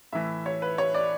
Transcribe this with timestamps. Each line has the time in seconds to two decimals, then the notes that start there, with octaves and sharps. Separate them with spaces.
0.13 A2 E3 E5
0.46 C#5
0.62 B4
0.78 C#5
0.94 D5